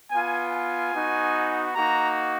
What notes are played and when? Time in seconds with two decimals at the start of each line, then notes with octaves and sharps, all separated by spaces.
0.11 B3 F4 G#5
0.52 G#5
0.93 B3 D#4 F#4
1.74 A#3 D#4 F#4 A#5